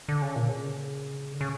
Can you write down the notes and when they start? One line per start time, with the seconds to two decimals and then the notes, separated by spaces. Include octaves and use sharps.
0.09 D3
0.22 C#3
0.36 A#2
0.49 C#3
1.33 D3
1.41 C#3